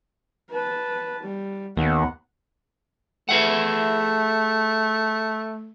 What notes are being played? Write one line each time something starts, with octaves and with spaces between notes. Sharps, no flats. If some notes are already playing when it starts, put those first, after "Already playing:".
B4 A5
G3
D#2 B3 F#5
A3 G#4 E5 F#5